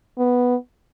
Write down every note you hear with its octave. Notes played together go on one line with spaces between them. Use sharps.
B3